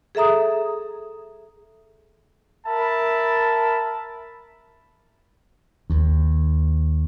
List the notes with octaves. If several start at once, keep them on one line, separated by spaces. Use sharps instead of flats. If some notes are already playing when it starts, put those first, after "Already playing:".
G#4 A4 E5 A#5 D#6
A#4 E5 A5 B5
D#2